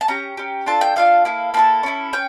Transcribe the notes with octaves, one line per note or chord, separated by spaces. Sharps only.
A5
C#4 G4 A#5
C#4 G4
D4 F4 A4 A5
G5
D4 F4 A4 F5
A#3 E4 A4
A#3 E4 A4 A5
C#4 E4 A4
C#4 G5